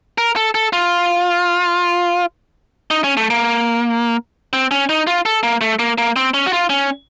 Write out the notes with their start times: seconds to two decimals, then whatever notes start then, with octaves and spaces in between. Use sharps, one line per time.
0.18 A#4
0.36 A4
0.55 A4
0.73 F4
2.91 D#4
3.04 C#4
3.17 A3
3.30 A#3
4.53 C4
4.71 C#4
4.89 D#4
5.07 F4
5.25 A4
5.43 A#3
5.61 A3
5.79 A#3
5.98 A#3
6.16 C4
6.34 C#4
6.46 F#4
6.53 F4
6.70 C#4